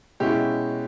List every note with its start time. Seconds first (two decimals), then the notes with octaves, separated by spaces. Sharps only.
0.20 B2 G#3 C#4 E4 G4